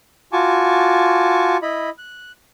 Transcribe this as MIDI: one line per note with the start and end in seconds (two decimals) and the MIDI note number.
0.33 1.57 65
0.33 1.57 66
0.33 1.57 80
0.33 1.57 81
0.33 1.57 85
0.33 1.57 86
1.62 1.90 64
1.62 1.90 75
1.62 1.90 83
1.98 2.32 90